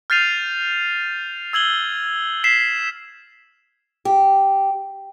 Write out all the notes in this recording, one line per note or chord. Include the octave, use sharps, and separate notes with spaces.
F6 G6 A6 C7 D#7 F7
E6 G#6 F#7 G7
B6 C7 E7
G4